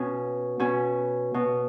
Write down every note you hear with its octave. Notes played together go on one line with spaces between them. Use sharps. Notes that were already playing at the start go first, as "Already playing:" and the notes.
Already playing: B2 C#4
B2 C#4
B2